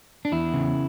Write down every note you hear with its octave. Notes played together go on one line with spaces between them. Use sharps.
D4
E2 E4
C#3